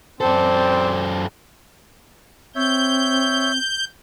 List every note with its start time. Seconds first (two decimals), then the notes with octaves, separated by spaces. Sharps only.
0.21 F#2 C4 A4 C5 D5
2.55 C4 C#5 E5 G6